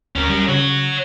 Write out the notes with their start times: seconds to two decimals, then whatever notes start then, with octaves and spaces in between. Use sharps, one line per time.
0.16 D2 C#4 A#4
0.30 G3
0.49 C#3 F#4 C#5